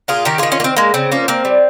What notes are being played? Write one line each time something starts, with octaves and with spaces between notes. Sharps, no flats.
A#2 F4 G#4
D#3 G4 A#4
D#3 F4 G#4
C#4 F4
A#3
C4
G#3 A#3
C#3 C4
F3 A#3 C#4
A#3 C4
G3